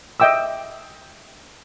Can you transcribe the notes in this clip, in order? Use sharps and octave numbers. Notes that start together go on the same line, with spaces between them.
D#5 E5 G5 D6 E6